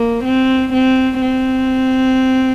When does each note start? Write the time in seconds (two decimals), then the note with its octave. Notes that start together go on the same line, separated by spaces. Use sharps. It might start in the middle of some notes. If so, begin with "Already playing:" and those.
Already playing: A#3
0.25 C4
0.73 C4
1.21 C4